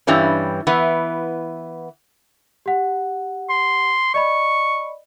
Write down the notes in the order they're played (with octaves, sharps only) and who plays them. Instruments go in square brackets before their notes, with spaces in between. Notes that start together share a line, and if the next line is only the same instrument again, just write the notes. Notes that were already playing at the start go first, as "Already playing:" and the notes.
[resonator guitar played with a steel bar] G2 E3 G3 C#4
E3 B3
[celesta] G4 F#5
[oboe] C6
[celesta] D5 D#5 B5 [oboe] C#6